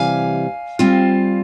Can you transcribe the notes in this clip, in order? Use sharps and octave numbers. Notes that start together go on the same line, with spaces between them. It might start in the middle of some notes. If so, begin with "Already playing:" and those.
Already playing: C3 E3 G3 F5 G#5
G3 C4 F4